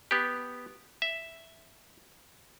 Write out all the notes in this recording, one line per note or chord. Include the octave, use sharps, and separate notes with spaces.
B3 G4
E5